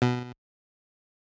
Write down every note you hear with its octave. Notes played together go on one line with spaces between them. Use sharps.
B2